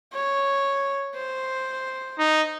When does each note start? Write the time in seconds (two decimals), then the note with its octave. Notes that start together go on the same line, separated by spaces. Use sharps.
0.13 C#5
1.15 C5
2.19 D#4